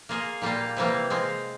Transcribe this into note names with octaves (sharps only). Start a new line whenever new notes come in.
A#3 F4 G#4
A#2 G3 A#3 F4
C3 E3 G3 A#3 F4
G#3 C4 F4